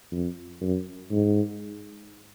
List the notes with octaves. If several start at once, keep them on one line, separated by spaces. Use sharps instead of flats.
F2
F#2
G#2